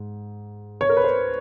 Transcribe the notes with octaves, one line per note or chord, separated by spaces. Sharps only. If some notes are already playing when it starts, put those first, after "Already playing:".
Already playing: G#2
C#5
A#4
B4
C5